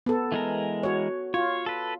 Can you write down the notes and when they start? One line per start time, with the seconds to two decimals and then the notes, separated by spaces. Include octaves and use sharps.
0.06 B3 A4
0.32 E3 G#3 A#4
0.83 F#4 C#5
1.34 F4 C#5
1.66 A4 B4